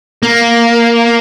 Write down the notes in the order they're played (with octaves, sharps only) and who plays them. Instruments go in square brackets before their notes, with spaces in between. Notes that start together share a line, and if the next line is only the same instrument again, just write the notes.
[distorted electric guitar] A#3